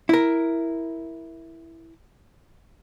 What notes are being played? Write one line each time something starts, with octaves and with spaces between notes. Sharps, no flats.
E4 A#4